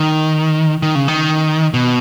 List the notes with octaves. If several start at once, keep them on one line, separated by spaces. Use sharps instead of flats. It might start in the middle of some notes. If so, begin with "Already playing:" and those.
Already playing: D#3
D#3
C#3
D#3
B2